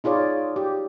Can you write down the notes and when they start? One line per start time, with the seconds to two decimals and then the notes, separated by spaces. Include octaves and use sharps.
0.04 D#4 F4 G#4 C#5 D5
0.56 G4